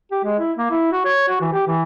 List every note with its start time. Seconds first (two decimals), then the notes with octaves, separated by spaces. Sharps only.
0.11 G4
0.25 G#3
0.39 E4
0.58 A#3
0.71 E4
0.92 F#4
1.05 C#5
1.28 F#4
1.41 E3
1.53 G4
1.67 E3